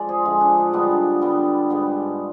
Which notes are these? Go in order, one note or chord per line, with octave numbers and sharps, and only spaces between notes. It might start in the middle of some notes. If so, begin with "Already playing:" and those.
Already playing: F3 G#3 D5
G#4 C5
D3 F3 G#3
D4
D#4
D3 G3 B3 D4 F4
D3 G3 B3
G#2 G3 B3